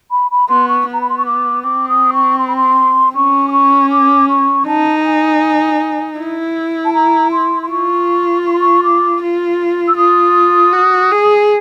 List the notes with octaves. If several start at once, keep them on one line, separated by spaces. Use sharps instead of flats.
B5
B5
B3 C6
C#6
B3
A#5
B5
C6
C#6
D6
C4 D6
D#6
C#6
C6
B5
C6
C#4 C#6
D6
C#6
D6
C#6
D#4 A5
A5
G#5
E4
A5
A#5
C6
C6
F4 C#6
C#6
C6
C#6
D6
F4
E6
F4 D#6
F#4
G#4